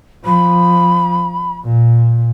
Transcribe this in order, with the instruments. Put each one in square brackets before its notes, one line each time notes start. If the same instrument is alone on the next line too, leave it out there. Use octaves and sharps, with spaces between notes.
[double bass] F3 [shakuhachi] B5
[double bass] A#2